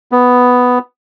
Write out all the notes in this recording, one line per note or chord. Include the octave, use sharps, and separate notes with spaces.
B3